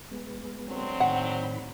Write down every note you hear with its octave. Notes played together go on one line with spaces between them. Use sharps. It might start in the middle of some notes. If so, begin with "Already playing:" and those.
G#3 B3
D3 F#3 C4
A2 D#3 F#5 B5